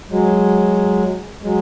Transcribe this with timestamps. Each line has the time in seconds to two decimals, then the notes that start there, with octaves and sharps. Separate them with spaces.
0.10 F#3 G#3
1.42 F#3 G#3